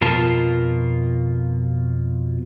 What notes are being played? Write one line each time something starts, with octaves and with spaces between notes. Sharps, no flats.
F2 B2 F4 A#4 A5